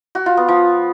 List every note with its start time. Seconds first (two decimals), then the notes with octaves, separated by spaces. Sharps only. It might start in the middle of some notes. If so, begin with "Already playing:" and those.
0.15 F#4
0.26 F4
0.37 B3
0.49 F3